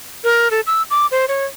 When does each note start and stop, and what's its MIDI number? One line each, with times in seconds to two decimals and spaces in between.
0.24 0.51 70
0.51 0.61 69
0.67 0.83 88
0.90 1.06 86
1.11 1.25 72
1.28 1.45 73